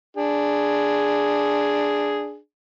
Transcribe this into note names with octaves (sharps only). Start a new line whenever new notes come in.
D4 G#4